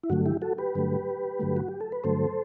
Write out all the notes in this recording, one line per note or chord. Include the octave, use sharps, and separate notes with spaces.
E4
G2 D3 F#3 A3 F#4
E4 G4
F#4 A4
G4 B4
G2 D3 F#3 A3
G2 D3 F#3 A3
F#4
G4
A4
B4
G2 D3 F#3 A3 A4 C5